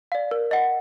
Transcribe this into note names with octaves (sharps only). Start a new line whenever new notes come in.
D5 F5
A#4
D#5 F#5